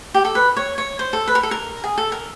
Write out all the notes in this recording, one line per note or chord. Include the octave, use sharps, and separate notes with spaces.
G4
A4
B4
C#5
C#5
C5
A4
B4
A#4
A4
A#4
G#4
A4
A#4